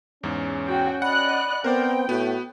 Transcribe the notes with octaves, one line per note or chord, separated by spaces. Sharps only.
E2 G#2 C#4
F#4 G5
D5 D#5 F#5 B5 F#6
B3 C4 A#4 C5 D5 G5
A2 B3 F#4 B4